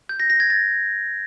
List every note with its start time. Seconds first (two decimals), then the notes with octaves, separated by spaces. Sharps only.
0.09 G6
0.20 A#6
0.30 A#6
0.40 G#6
0.50 A6